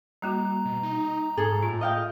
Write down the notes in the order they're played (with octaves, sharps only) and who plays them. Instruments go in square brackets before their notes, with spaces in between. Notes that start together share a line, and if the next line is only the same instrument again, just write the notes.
[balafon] G3 A#3 F#4 [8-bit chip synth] A#5
[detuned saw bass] B2
D#4
[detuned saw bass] G#2 [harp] G#4 A4
[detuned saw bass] A2 [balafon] F4
[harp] D#5 F5 G5